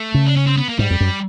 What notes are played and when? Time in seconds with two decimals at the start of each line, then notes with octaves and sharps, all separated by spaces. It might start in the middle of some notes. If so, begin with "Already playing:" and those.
Already playing: A3
0.14 C#3
0.26 D4
0.36 C#4
0.47 C4
0.57 B3
0.68 A#3
0.79 G#2 G3
0.91 F2
1.01 F#2